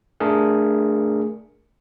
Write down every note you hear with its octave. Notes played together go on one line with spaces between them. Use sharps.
A3 D4 G#4 A#4